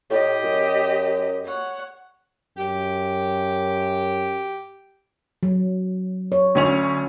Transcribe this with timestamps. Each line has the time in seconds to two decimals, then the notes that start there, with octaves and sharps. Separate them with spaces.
0.10 A2 G4 D#5
0.44 F#2
1.45 C#5 F#5
2.57 F#2 G4
5.43 F#3
6.32 C#5
6.55 D2 C#4 F7